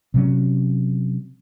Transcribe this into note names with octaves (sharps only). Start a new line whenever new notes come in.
C3 F#3 C#4